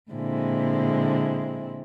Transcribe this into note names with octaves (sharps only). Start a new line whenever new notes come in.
A#2 D3 G#3 C4 E4